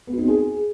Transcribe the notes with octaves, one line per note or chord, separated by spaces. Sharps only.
B3
F#4
D#4
C4
G#4